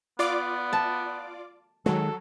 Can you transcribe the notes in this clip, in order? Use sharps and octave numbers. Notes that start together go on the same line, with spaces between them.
B3 F4 D5 D6
A5
D#3 F#3 G#3 A4